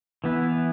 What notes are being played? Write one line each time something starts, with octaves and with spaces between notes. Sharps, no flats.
E3 B3 E4